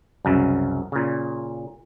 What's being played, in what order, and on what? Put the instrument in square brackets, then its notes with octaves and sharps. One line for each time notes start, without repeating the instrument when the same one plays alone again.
[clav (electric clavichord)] C2 F#2 C#3
A#2 C#3